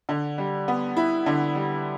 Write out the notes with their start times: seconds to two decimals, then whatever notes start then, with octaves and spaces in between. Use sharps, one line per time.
0.09 D3
0.38 G3
0.68 B3
0.97 E4
1.26 D3
1.55 G3